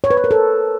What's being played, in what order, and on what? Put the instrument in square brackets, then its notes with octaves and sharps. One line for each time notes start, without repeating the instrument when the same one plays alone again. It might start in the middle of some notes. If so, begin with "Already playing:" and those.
[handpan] C#5
B4
C#5
A#4
A4